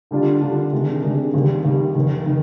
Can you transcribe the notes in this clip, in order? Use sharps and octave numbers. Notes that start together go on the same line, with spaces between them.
D3 G3 D4 F4
D3 G3 D4 F4
C3 D#3 G#3 D4
C3 D#3 G#3 D4
D#2 D#3 G3
D#2 D#3 G3
F1 D#2 D#3
D#3